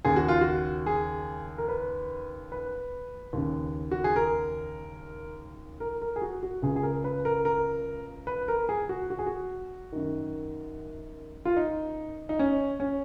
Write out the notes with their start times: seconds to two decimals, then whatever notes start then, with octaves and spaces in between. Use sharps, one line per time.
0.05 D#2 C#3 G#4
0.16 F#4
0.28 F4
0.41 F#4
0.86 G#4
1.58 A#4
1.69 B4
2.52 B4
3.33 D#2 C#3
3.91 F#4
4.04 G#4
4.16 A#4
5.80 A#4
6.01 A#4
6.16 G#4
6.22 F#4
6.43 F#4
6.62 C#2 C#3 G#4
6.76 G#4
6.83 A#4
7.04 B4
7.25 A#4
7.45 A#4
8.27 B4
8.48 A#4
8.69 G#4
8.89 F#4
9.10 F#4
9.19 G#4
9.26 F#4
9.93 F#2 D#3
11.45 F4
11.57 D#4
12.29 D#4
12.39 C#4
12.80 C#4